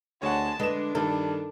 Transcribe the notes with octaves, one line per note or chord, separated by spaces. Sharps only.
D2 G#3 C#5 F#5 A5
D3 G#3 D4 B4 E7
G2 D#3 A4